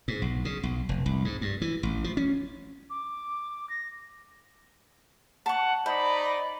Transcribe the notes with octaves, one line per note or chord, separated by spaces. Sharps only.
G#2
B1
C#3
B1
F1
C2
G#2
G2
E3
A1
F3
C#4
D6
A#6
F#5 A5 C#6
D#4 C5 D5 D#5 B5
B5